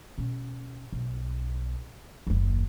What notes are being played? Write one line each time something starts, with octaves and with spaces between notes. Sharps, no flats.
B2 C#4
B1
F#1 D#2